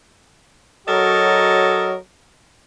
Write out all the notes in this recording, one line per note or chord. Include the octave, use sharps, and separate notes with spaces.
F#3 F#4 A4 A#4 C#5 D#5